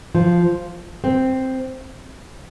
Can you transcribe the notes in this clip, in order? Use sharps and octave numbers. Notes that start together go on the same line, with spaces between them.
F3
C4